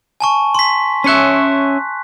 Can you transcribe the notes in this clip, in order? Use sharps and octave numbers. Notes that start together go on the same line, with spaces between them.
G#5 A5 C#6
C6 B6
C#4 C#5 E5 F#6 B6